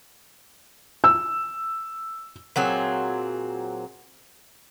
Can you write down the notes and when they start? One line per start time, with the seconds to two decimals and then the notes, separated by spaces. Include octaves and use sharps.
1.04 E6
2.56 A#2 F#3 C4 G#4